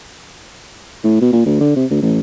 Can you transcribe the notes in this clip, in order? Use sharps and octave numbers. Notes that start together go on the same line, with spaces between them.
A2
B2
A#2
D2
D3
C3
D2
A1